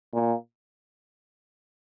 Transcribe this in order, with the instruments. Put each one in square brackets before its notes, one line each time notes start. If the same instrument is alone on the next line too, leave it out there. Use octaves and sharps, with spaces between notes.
[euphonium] A#2